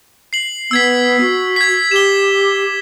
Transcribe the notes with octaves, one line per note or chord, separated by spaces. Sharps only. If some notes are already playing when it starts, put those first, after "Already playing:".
C7 F#7
B3 E6 G#6 B6
F#4
G#6 B6
G4 E7 G7